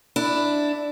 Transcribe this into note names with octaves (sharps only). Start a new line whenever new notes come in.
D4 E4